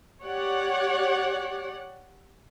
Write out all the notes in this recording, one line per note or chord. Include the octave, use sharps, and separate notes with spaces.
G4 C#5 D5 F#5